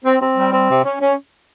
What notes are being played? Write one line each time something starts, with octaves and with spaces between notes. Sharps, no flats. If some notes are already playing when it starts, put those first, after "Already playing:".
C4
C4
G3
C4
C3
C#4
C#4